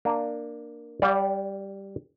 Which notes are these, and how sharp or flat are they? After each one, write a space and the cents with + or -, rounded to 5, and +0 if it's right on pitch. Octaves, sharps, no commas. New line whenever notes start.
A#3 +0 D4 +15
G3 +0 D5 -35 F#5 -45